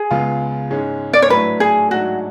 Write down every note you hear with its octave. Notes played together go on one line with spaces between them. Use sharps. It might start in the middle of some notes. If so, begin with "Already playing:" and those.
Already playing: G#4
C#2 C#3 G#3 B3 F4
G#2 G#3 C#4
D5
C#5
A2 F#3 A3 D4 B4
G#4
G#2 F#3 A3 D4 F#4 G#4